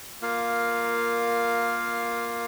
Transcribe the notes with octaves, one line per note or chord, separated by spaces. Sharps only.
A#3 F4 A#4 F5